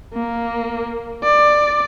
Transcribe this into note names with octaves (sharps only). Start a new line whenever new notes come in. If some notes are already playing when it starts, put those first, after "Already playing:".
A#3
D5